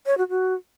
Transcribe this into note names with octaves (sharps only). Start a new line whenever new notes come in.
C#5
F#4
F#4